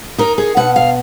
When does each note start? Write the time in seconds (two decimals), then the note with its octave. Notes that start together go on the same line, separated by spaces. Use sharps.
0.18 D#4 A#4
0.38 G#4
0.57 B2 F#5
0.76 F5